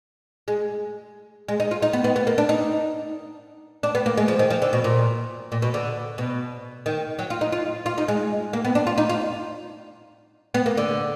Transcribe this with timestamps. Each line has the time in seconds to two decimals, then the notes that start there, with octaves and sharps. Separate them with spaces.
0.48 G#3
1.48 G#3
1.60 D#4
1.71 F4
1.82 D#4
1.93 B3
2.04 B3
2.16 B3
2.27 A#3
2.38 D4
2.49 D#4
3.83 D4
3.95 B3
4.06 A#3
4.17 G#3
4.28 F3
4.39 D#3
4.50 F3
4.62 D3
4.73 B2
4.84 A#2
5.52 A#2
5.62 B2
5.74 D3
6.18 B2
6.86 D#3
7.19 F#3
7.30 F4
7.41 D#4
7.52 F4
7.86 F4
7.98 D#4
8.08 G#3
8.53 A#3
8.65 B3
8.75 D4
8.87 F4
8.98 D#4
9.09 F4
10.54 B3
10.66 A#3
10.77 D3